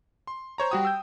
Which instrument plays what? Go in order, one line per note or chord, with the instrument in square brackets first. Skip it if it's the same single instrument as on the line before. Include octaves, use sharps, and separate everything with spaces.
[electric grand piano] C6
C5 C#5 A#5
[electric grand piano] G3 F#4 D#6 [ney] G5
[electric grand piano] E6 G6